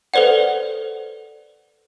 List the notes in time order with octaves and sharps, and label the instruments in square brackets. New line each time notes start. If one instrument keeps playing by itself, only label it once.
[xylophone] A4 B4 C5 D5 F#5